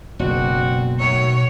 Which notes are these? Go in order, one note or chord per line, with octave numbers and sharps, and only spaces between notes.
F#1 B2 C4 D4 F#4
D#3 F#3 A3 C#5